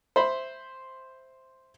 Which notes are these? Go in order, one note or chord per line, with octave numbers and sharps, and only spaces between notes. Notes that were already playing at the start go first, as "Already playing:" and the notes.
C5 E5 B5 C6